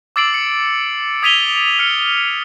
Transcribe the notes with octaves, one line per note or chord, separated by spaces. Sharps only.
D6 E6 A6 C7 D7 F#7
C#7
D#6 G#6 B6 D#7 F7 G7
F6 C#7